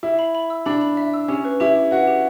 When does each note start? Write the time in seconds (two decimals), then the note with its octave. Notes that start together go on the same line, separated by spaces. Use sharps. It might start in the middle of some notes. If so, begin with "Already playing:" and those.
0.03 E4 B5
0.19 B5
0.35 B5
0.50 E6
0.66 D4 B5
0.81 B5
0.97 E5
1.14 E6
1.28 C#4 G4
1.45 B4
1.60 E4 G4
1.76 G4
1.91 F#4 B4
2.07 G4